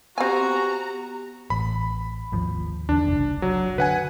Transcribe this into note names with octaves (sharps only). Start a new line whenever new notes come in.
B3 C4 F#4 G4 G#5 A#5
A1 B5
G#1 D#2 F3
E2 D3 D4
F#1 C2
F#3
D3 B4 F#5 G#5